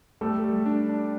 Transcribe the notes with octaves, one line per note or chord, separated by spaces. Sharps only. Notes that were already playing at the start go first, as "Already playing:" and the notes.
G3 A3 A4
G3
D4
D4